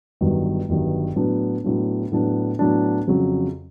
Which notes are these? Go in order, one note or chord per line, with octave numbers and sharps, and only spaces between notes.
G1 G2 D#3 F#3
G1 G2 D#3 F#3
A2 F#3 B3 D4
A2 F#3 B3 D4
A2 F#3 B3 D4
A2 F#3 B3 D4
F2 C#3 F#3